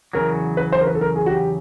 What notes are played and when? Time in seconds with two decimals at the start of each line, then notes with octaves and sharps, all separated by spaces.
0.13 E2 C#3 F#3 A#4
0.57 B4
0.72 C5
0.81 A#4
0.87 B4
0.95 A4
1.01 A#4
1.16 G#4
1.26 F#4
1.30 G4